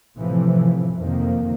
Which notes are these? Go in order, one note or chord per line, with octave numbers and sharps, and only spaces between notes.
A2 C3 E3 F3
F2 C3 D#3 A#3